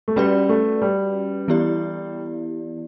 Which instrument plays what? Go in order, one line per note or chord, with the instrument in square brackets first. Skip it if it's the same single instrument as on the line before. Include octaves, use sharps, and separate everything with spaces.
[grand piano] A3
[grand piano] G3 [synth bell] C#4 F#4 B4 D5
[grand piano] A3
G3
[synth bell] E3 B3 E4 G4 D5